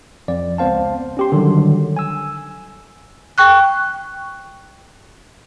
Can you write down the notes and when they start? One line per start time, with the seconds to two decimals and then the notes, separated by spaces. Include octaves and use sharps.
0.28 F2 D5
0.58 C#2 B3 C4 C5 F5 A5
1.17 C#4 G4 C6
1.32 D3 D#3 F#3 G3
1.97 G#5 E6
3.38 G5 C#6 F#6